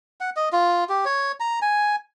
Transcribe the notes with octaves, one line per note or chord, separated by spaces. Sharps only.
F#5
D#5
F4
G4
C#5
A#5
G#5